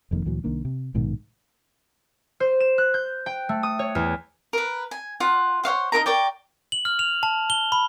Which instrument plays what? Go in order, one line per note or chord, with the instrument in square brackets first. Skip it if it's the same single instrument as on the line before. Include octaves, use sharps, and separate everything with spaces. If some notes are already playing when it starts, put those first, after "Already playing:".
[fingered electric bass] F1 F2 D#3 A#3
D2 A#2 E3 F#3
C2 D#3 A#3 D4
C3
A#1 G#2 B2 D#3
[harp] C5
E7
F#6
G6
G5
A3
D#6
C#5
E2
[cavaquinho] A#4 B4
G#5
F4 F#5
C5 C#5 F5 F#5
D#4 E4 A#4 A#5
A#4 C#5 D5 G5
[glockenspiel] F#7
F6
F7
A5
G7
B5